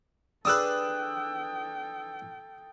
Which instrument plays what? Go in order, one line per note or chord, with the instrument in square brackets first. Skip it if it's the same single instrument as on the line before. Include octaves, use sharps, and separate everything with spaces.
[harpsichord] D4 G#4 B4 [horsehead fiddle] A4 G5 [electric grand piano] D#6 E6 F#6